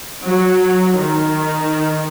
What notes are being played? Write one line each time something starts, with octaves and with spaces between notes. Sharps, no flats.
F#3
D#3